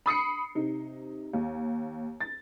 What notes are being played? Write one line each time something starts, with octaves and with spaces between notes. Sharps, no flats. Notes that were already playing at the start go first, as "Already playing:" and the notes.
B5 D#6 C7 C#7
C3 D#4
D#2
A6